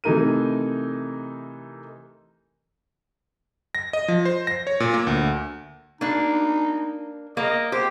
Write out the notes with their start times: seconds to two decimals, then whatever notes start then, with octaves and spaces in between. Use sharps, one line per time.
0.04 C3 E3 A3 D#4 A#4 D#7
3.75 A#6
3.93 D#5
4.08 F3
4.25 C5
4.47 A#6
4.67 C#5
4.80 A#2
4.94 A#3
5.07 D2
6.01 A#3 D4 D#4
7.37 A#3 D#5
7.72 G4 C5